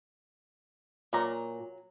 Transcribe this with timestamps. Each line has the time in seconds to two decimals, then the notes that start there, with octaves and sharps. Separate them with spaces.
1.13 A#2 F#3 A#5